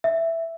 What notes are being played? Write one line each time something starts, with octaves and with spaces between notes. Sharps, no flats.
E5